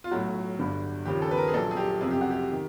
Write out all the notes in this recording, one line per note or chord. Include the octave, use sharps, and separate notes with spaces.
F4
B1 A2 F#3 F#4
G1 G2 D3
D#2 C#3 F3 G4
A4
B4
A#4
G#4
A#1 A#2 F#3 A4
G#4
G4
F#1 F2 C3 G#4
G4
F#4
G4
D#3